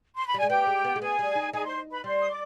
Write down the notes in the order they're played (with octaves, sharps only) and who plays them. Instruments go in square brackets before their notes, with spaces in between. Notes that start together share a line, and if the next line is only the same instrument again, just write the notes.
[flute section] C6
B5
[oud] G3
[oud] G#3 [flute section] G#5
[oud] B3 [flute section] G4 G5
[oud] G#3
B3
G#3
[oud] B3 [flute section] G#4 G#5
[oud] G3
D#4
[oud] D#4 [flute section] G#4 G#5
[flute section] C5 C6
B4 B5
[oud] G3 [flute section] C5 C6
[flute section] D#6
D5 D6